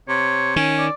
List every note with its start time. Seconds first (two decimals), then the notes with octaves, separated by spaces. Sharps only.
0.09 C3 C#5
0.56 D#3 C#4
0.78 D5